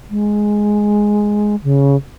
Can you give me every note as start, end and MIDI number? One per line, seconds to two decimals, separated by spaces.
0.10 1.56 56
1.64 1.96 49